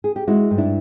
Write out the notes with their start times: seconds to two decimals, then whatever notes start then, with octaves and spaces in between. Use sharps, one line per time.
0.04 G#4
0.16 G4
0.28 G#3 E4 F#4
0.51 G2
0.58 D4 E4